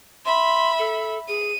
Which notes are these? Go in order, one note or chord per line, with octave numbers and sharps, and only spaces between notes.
E5 B5 C6
A4
G#4 D#7